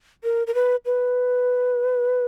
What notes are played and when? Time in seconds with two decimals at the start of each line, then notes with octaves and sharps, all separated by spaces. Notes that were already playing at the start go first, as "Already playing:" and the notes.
0.24 A#4
0.47 A#4
0.54 B4
0.86 B4